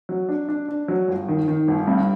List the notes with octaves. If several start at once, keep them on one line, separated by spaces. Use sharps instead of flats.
F#3
D4
D4
D4
F#3
G1
D#3
D#3
G1
G2